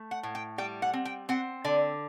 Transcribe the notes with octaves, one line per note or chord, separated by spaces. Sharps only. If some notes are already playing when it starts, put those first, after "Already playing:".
Already playing: A3
F#5
A2
G5
G3 G5
F#5
C4
G5
C4 F#5
D3 D5